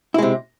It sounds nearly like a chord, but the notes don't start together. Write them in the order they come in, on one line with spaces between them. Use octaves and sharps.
E4 G#3 C3